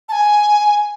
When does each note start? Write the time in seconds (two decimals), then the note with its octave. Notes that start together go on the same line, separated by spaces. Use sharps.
0.09 A5
0.12 G#5